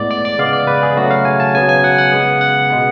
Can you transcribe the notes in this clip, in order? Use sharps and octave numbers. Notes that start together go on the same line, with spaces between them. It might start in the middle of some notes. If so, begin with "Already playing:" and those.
Already playing: A2 G#3 B3 D5
D5
D5
C#3 G#3 B3 F5
D5
B4
G#4
C#3 F#3 A3 F#4
F5
G#5
A5
C#3 F#3 B3 G#5
G#5
F#5
F#5
C#3 G#3 B3
F#5
B2 G#3 B3